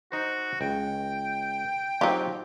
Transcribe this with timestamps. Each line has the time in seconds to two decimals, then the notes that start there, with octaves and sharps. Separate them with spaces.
0.12 D#4 F#4 C5
0.61 C#2 G5
2.01 F#3 C4 D#4 F4 G4